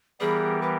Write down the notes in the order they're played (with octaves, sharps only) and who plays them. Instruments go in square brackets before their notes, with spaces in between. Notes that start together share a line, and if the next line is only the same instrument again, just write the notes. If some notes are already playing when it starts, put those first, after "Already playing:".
[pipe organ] E3 G3 B3 G4 A#4 [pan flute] G#4
[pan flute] B4